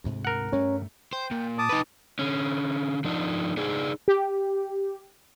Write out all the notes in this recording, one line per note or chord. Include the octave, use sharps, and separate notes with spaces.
D2 G#2 C3
A#4 F#5
G2 G3 A3 C#4 C#5 A#5
C5 G5
A#2
A5 D6 D#6
D#4 B4
D3 C#4
F3 D4 D#4
D4 D#4 G#4 D5
G4